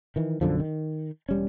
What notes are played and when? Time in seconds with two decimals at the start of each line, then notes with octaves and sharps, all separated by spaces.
0.16 D#3 E3
0.41 B1 F#2 D3 F3
0.59 D#3
1.29 E1 G3 C#4